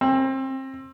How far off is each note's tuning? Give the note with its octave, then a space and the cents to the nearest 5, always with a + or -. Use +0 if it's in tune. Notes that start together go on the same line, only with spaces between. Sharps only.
C4 +30